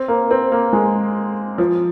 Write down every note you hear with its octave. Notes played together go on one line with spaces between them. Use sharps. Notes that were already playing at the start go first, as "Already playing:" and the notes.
Already playing: C4
A#3
C4
A#3
G#3
F3